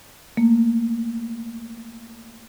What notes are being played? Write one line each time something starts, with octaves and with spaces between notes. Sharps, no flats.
A3 A#3